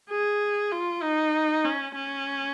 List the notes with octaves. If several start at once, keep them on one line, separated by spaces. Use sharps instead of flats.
G#4
F4
D#4
C#4
C#4